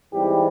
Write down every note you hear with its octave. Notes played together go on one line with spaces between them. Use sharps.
G#2 E3 G3 C4 G4